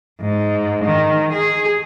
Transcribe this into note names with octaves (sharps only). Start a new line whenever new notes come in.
G#2
D#3
G#4